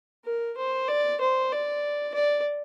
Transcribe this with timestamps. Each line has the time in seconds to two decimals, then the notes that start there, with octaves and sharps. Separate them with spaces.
0.25 A#4
0.57 C5
0.88 D5
1.21 C5
1.52 D5
2.14 D5